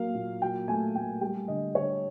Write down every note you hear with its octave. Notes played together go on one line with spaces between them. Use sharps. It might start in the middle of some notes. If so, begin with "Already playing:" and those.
Already playing: F#3 A#3 F5
A#2
F#3 G5
A3 G#5
A3 G5
G3 G5
D3 D#5
D3 C#5